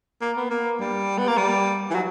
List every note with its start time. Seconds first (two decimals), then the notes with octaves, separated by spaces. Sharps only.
0.21 A#3
0.36 B3
0.50 A#3
0.79 G3
1.18 B3
1.27 A#3
1.37 G3
1.90 E3
1.94 F#3